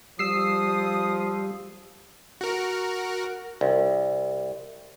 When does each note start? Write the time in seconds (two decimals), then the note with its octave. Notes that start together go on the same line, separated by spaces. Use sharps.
0.19 F3 G3 D#6 E6 C7
2.41 F#4 A#4
3.61 C2